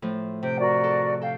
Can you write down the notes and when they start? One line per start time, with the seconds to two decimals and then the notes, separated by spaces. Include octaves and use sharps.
0.02 A2 F3
0.43 C3 G5
0.59 F#4 A#4 D5
0.84 A4
1.21 A4 F5 G5